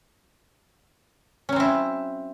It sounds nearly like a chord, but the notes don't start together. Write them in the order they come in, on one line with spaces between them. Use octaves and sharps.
C#4 F#3 C4 E4